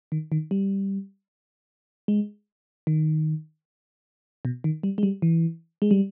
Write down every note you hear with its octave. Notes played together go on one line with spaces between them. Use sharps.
D#3
D#3
G3
G#3
D#3
B2
D#3
G3
G#3
G3
E3
G#3
G3